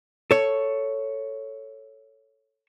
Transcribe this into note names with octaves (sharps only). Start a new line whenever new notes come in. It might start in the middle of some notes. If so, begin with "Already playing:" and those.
A4 C#5